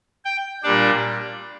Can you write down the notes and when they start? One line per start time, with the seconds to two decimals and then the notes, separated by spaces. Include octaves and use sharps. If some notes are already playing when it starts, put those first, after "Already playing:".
0.25 G5
0.63 A#2 G3 D4 D5